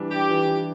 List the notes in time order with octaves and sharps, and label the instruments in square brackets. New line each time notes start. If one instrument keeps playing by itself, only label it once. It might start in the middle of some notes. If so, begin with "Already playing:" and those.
Already playing: [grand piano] E3 G3 D4
[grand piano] D4 [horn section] G4
[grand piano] E3
E3